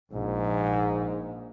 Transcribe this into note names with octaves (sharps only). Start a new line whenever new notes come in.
A#1 G#2